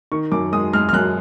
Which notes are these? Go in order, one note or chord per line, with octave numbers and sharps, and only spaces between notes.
D#3 C#6
F#2 D6
G#3 D#6
G#3 F6
F6
F#2 F#6